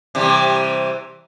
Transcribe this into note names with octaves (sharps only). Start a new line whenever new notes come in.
C3 E3 G3